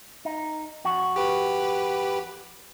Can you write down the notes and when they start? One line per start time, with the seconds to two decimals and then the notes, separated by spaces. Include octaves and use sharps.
0.25 D#4
0.84 F2 F#4
1.16 G4 B4